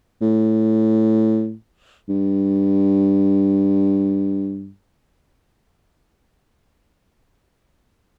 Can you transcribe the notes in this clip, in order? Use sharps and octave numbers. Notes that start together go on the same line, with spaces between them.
A2
G2